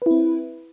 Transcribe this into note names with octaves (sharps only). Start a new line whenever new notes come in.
C4 E4 B4